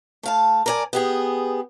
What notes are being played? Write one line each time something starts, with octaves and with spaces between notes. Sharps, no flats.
A3 F5 A5
A#4 D5 G#5
B3 G4 G#4